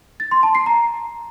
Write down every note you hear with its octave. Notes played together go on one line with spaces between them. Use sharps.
A6
C6
A5
C7
A#5